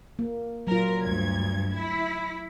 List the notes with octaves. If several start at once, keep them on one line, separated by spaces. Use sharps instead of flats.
A#3
A#2 F#3 F4 A#4
D2 G2 G#6
E4